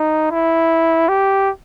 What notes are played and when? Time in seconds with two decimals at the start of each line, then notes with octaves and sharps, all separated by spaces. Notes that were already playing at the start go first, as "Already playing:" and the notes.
Already playing: D#4
0.31 E4
1.09 G4